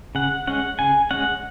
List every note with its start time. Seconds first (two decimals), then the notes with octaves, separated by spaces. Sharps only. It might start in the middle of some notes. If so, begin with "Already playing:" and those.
0.15 C#3 F#5
0.47 G#3 C#4 F#5
0.79 C#3 G#5
1.11 G#3 C#4 F#5